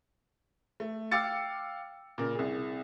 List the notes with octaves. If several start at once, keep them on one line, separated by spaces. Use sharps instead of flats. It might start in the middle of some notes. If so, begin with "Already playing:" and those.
A3
F5 G5 D6 E6 A6 C#7
A#2 C#3 A#4
C2 G#4